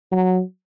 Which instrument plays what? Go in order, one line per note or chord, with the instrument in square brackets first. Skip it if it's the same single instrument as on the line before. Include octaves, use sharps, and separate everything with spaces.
[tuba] F#3